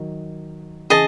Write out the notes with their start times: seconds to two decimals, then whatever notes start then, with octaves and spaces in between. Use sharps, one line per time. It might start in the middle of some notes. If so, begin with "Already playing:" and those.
Already playing: D#3 F#3
0.90 C#3 E3 G#4 D#5 A5